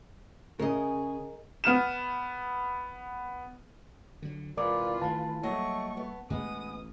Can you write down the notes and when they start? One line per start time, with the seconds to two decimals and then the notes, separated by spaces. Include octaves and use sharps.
0.59 C#3 G#4 A#4 D#5
1.64 B3 F6 E7
4.22 D3 F#3
4.57 C3 E3 G#3 F4 A#4 B4 D5 D6
5.02 D#3 A3 A5
5.43 F#3 G3 A3 A#3 D#5 C#6
5.97 B3
6.30 A1 A2 G#3 B3 D#6